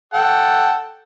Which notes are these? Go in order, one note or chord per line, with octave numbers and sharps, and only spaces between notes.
A4 F#5 G5